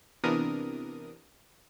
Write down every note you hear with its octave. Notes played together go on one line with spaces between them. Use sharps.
C3 E3 B3 D4 A#4 D#6